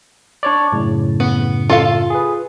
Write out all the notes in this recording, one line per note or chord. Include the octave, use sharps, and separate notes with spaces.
D4 C#5 D5
F#2 A2 C#3
B3
F4 A4 F5
G#4 B4